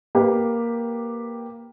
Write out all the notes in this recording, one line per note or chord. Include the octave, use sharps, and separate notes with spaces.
A#3 G4 B4